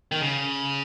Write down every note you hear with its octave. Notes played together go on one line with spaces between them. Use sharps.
D#3
C#3